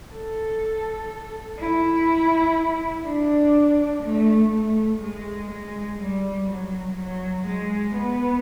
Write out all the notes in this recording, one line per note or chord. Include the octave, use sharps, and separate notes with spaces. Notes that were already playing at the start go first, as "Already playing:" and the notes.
A4
E4
D4
A3
A3
G#3
G#3
G3
F#3
F#3
G#3
B3